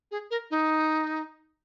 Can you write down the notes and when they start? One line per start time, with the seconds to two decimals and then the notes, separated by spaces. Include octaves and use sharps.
0.11 G#4
0.31 A#4
0.51 D#4